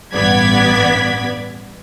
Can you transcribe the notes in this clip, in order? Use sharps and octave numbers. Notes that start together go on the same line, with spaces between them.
A1 G2 B3 D5 G#6 B6